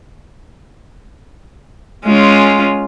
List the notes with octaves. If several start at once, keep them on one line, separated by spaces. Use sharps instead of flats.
G#3 C#4 F4